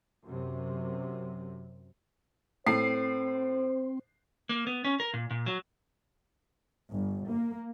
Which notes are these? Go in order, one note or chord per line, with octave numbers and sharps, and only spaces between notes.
F#2 C3
A2 C4 C5 C7
A#3
B3
C#4
A#4
A#2
A#2
F#3
G1
A#3